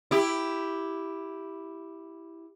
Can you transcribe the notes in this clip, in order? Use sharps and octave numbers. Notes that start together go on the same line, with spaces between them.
E4 G4